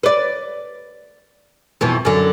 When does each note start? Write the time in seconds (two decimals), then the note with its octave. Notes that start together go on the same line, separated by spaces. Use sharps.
0.03 B4 D5
1.81 F2 B2 E3
2.05 F#2 D3